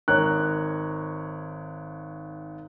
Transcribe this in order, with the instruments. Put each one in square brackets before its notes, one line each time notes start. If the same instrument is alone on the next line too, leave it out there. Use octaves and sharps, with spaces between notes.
[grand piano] G#1 A#4 C#5 F#6